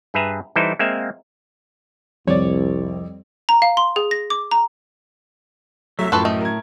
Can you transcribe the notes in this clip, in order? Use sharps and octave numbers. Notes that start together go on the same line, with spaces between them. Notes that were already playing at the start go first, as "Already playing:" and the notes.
G2 G#4 B4 E5 A#5
E3 G3 D#4 E4 A4 C5
G#3 A#3 C4 E5 F5
C2 F2 G3 C4 C#5 D5
A#5
F5
C6
G#4
A#6
D6
A#5
C2 F#3 A3 E5
F#2 A2 F3 A4 B4 A5 C6 C#6
A3 D#5
A#4 G#6